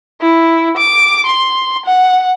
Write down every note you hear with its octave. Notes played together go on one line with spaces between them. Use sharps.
E4
D6
C6
F#5